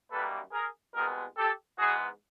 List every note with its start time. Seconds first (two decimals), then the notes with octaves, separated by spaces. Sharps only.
0.10 F#2 D#3 G3 A#3 A4 B4
0.52 G#4 A#4
0.94 C2 B2 G#3 B3 G#4 A#4
1.37 G4 A4
1.79 G#2 E3 G#3 B3 F#4 G#4